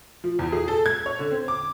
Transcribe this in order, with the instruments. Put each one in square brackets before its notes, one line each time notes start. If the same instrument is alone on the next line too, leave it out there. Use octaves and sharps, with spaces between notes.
[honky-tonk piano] F3
E2
G#4
A4
G#6
C#5
D3
C4
D6